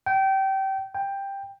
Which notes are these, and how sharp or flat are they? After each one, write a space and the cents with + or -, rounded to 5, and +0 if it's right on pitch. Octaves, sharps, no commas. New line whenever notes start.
G5 -25
G5 +10